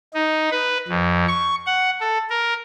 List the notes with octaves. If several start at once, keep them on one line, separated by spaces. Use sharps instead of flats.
D#4
B4
F2
C#6
F#5
A4
A#4